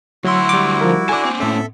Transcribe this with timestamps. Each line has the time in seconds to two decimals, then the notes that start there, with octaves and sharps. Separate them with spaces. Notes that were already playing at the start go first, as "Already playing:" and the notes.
0.24 D2 F#3 E4 F#4 C6 E6
0.49 G3 D6
0.81 F3 A#4
1.09 A4 D5 G#5 D6
1.25 A#3 C4
1.40 A2 C#4 A4 E5